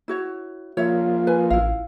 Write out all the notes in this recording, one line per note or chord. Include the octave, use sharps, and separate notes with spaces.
E4 F#4 C#5
F3 A#3 F4 C#5 E5
B4 G#5
A1 E4 F5